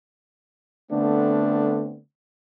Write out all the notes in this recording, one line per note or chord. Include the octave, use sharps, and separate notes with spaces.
D3 A3 B3 C4 D4